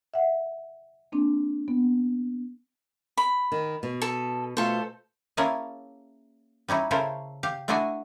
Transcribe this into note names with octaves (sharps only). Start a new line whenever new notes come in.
E5 F#5
A#3 C4 D4
B3
B5
D#3
B2
A4
B2 A3 F4 A4 C5
A#3 C#4 E4 G#4 A#4 A5
G3 C#4 D#4 E4
C#3 C#4 E4 A4 A#4 C5
G4 F5
A3 D4 E4 F#4 D#5 G#5